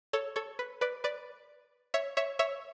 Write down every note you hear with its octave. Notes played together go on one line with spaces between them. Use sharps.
A4 C#5
A4 C#5
B4
B4 D5
B4 D5
C#5 E5
C#5 E5
C#5 E5